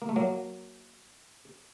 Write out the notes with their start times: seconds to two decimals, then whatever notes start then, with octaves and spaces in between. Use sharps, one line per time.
0.02 A#3
0.09 A3
0.16 F#3 A#3